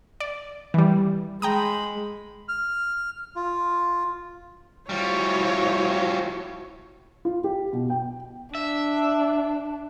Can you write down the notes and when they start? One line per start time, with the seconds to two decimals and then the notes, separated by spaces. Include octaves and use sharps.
0.20 D5
0.74 E3 G3
1.42 G#3 G5 A#5 B5 D#6
2.48 F6
3.36 F4
4.89 F3 G3 E4 F#4 C#5
7.25 F4
7.44 G4
7.73 B2
7.90 G5
8.55 D4 E5